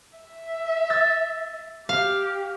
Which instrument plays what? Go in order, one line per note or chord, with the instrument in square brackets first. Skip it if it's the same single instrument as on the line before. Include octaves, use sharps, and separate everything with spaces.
[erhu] E5
[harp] E6 A6
[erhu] G4 [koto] F5